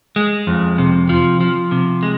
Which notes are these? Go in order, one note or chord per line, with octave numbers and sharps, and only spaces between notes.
G#3
F2
C3
F3
F3
C3
G#3